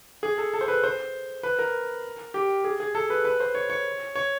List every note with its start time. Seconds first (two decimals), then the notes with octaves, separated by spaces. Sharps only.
0.23 G#4
0.38 A4
0.54 A4
0.61 C5
0.68 B4
0.84 C5
1.43 B4
1.59 A#4
2.34 G4
2.64 G#4
2.80 G#4
2.95 A4
3.10 B4
3.25 B4
3.40 C5
3.55 C#5
3.70 C#5
4.15 C#5